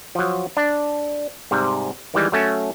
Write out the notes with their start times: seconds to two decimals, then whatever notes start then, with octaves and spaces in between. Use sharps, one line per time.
0.15 F3 F#3
0.57 D4
1.51 G#2 C3 G3
2.14 D#3 E3 G3 G#3
2.32 F#3 A3 C#4